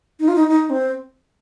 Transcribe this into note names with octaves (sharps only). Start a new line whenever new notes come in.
D#4
F4
D#4
D#4
C4